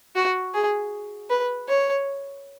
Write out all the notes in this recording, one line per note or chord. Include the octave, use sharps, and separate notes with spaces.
F#4
G#4
B4
C#5